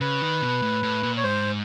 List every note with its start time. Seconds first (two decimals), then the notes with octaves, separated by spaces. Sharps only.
0.01 C#3 B4
0.22 D#3
0.42 B2
0.62 A2
0.83 A2
1.03 A#2
1.17 C#5
1.24 G#2 C5